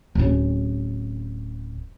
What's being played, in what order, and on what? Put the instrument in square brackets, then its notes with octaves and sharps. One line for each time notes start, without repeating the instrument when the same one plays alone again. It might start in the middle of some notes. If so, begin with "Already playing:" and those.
[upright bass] D1 C#4